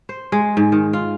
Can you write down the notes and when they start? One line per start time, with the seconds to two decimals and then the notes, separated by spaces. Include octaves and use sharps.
0.09 C5
0.32 G#3
0.57 G#2
0.72 D#3
0.93 F4